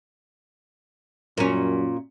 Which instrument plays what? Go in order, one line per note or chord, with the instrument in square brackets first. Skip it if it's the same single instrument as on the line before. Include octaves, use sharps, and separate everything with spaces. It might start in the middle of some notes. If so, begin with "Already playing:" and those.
[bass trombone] F#2 [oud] A#2 C#4